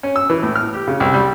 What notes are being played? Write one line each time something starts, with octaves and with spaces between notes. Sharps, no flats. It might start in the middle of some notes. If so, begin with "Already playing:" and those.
C#4
E6
E3
A2
F6
G4
C#3
C2
G3